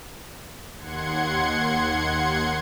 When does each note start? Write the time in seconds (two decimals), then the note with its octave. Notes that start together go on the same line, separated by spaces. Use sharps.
0.79 D#2 F#5 C6 G#6 C#7